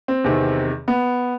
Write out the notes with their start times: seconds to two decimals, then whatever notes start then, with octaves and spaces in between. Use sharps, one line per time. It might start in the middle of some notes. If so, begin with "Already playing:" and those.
0.08 C4
0.24 E2 C3 D#3
0.88 B3